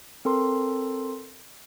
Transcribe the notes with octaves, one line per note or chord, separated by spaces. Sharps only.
C4 A4 A#4 C6